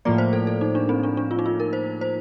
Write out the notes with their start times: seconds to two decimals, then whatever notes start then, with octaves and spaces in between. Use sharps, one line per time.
0.05 A2 F3 A#3 D5
0.18 C5
0.33 A4
0.47 A4
0.61 D#4
0.75 D4
0.89 C4
1.03 D4
1.17 D4
1.31 F4
1.39 D#4
1.46 F4
1.60 A#4
1.73 C5
2.01 C5